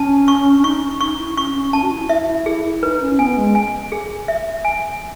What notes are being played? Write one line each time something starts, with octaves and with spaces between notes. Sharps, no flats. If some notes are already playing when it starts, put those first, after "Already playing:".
Already playing: C#4 A5
C#6
C#4
D#4 C#6
D#4 C#6
E4
C#4 C#6
C#4
C#4 A5
F#4
E4
E4 E5
E4
E4 G#4
E4
D#4 B4
C#4
B3 G#5
G#3
G#5
G#4
E5
G#5